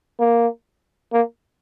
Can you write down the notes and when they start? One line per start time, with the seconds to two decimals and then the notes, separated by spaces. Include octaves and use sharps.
0.20 A#3
1.13 A#3